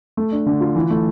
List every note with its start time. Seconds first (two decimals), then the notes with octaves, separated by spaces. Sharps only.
0.17 A3
0.32 D4
0.46 D3
0.61 F4
0.76 E3
0.91 A3